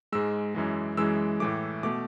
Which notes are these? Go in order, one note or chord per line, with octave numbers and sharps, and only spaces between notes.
G#2 G#3 E6
F#2 E3 G#3
F#2 E3 G#3 E6
A2 E3 A3 D6
B2 A3 D6